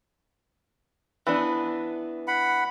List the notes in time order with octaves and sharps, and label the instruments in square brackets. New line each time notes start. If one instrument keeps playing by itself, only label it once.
[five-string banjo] E3 B3 D4
[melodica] F#5 B5